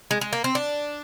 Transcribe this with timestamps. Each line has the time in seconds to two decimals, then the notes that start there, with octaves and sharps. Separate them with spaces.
0.11 G#3
0.21 G#3
0.33 A#3
0.44 C4
0.55 D4